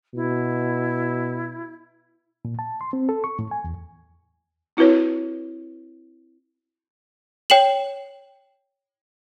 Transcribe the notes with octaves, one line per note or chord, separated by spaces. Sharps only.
B2 E4
A#2
A5
C6
C4
A4
C#6
A2
G#5
E2
C4 E4 F#4 B4 C#5
C#5 G5 C7 E7 F#7